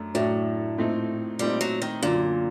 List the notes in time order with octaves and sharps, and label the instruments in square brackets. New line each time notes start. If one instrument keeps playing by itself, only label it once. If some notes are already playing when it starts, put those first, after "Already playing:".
Already playing: [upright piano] F#2 F#3 A3 D4
[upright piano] F#2 F#3 A3 D4 [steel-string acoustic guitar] A2
[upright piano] A#2 A3 C4 D#4
[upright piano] A#2 A3 C4 D#4 [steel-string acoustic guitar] G3
[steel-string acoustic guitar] F#3
D#3
[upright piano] F#2 D3 F#3 [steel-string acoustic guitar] A#2